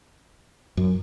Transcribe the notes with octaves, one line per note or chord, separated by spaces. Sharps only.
F#2